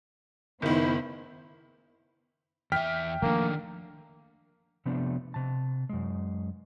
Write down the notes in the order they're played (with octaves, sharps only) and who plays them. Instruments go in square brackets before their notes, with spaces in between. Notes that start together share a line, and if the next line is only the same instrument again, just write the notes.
[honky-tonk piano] F#1 D#3 [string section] B3 E4 C5
[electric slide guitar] E2 E5 [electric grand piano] G5 F6 B6
[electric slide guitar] D#3 D4 [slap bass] F3 G3 A3 [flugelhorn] A#3
[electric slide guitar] C3 F3 A3 B3 D4
C3 A5
F#2 G#3